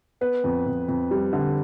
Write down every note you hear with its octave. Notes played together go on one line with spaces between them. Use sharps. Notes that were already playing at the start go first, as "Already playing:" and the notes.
B3 B4
F2
F2
F2
G3
D3